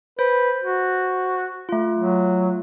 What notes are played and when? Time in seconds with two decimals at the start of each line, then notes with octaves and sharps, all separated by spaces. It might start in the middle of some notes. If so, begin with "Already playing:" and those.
0.19 B4 C5
0.64 F#4
1.69 A3 F4
1.97 F#3